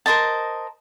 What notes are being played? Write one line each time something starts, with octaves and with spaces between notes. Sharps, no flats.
A#4 C5 D#5 A5